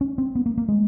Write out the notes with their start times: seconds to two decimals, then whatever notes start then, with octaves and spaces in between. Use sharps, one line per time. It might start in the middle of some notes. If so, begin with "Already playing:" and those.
0.01 C#4
0.18 C4
0.35 B3
0.46 A#3
0.58 A#3
0.69 G#3